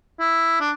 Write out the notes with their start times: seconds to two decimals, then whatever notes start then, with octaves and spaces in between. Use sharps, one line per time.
0.20 E4
0.60 D4